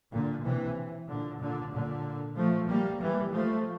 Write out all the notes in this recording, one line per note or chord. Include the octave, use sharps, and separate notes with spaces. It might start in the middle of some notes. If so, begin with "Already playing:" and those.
A#2 D3
C3 E3
A#2 D3
A#2 D3
A#2 D3
F3 A3
G3 A#3
E3 G3
F3 A3